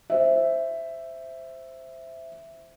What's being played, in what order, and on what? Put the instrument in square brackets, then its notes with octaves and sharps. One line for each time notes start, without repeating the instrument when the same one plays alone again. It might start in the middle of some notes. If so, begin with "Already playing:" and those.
[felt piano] C5 E5